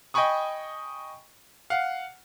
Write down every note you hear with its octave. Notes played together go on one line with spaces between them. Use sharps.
D#5 G5 G#5 B5 C#6 D#6
F5 F#5